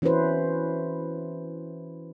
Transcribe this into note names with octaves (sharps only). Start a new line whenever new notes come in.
E3 C#4 E4 F#4 B4 C5